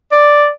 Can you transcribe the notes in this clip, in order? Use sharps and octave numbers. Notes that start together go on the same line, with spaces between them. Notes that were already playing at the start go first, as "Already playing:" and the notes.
D5